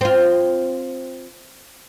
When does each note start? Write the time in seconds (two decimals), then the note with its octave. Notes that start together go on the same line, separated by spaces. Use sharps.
0.01 C4 F4